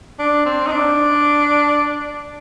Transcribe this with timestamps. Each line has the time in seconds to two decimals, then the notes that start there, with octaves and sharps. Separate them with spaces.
0.19 D4
0.45 C4
0.67 D#4
0.72 D4